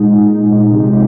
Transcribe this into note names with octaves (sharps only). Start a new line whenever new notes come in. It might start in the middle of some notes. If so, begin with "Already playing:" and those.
Already playing: A#2 G#3 D#4
C3 F3 G#3 D#4 G4